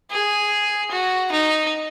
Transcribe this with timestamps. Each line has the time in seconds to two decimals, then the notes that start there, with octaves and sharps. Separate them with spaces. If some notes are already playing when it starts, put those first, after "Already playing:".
0.11 G#4
0.91 F#4
1.32 D#4